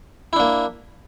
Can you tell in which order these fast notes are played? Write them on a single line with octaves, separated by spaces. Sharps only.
E4 D4 A#3